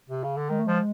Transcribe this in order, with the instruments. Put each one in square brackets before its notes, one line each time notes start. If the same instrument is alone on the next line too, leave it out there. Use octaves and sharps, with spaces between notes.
[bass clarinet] C3
C#3
D3
[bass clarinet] D#3 [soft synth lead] G#3
[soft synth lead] A3
[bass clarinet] F3 [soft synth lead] G#3